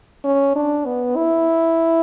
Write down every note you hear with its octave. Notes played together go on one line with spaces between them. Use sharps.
C#4
D4
B3
E4